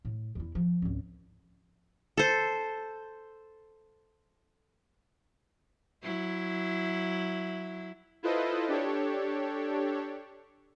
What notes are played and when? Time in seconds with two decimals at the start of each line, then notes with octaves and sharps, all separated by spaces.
0.05 A2
0.35 E2 E4
0.55 F3
0.82 G#1 C#2
2.17 A4 C5
6.03 F#3 E4
8.23 E4 F4 A4 B4 C5 D#5
8.68 D4 G4 A4 C#5